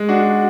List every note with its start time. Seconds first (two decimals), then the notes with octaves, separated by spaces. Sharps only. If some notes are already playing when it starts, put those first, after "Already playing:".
Already playing: G#3
0.09 D4 F#4
0.21 F#4